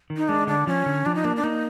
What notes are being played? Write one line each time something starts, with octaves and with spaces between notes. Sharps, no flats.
D#3
D#4
G#3 D4
D3 D4
F3 C#4
D3
F3 D4
D#4
A#3 D4
D4
A#3 D#4